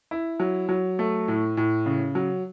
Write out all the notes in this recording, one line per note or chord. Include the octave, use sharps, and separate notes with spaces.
E4
F#3
F#3
A3
A2
A2
C#3
F#3